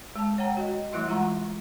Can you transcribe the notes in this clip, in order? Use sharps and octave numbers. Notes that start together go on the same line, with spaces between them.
G#3 A5
C#5 F#5 G5 A#5
F#4 D#5
E3 G3 A3 E4 E5 C6
G#3 F4 F#5 A#5 C#6